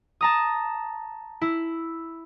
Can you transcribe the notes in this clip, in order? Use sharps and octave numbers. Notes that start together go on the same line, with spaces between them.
A5 A#5 D#6
E4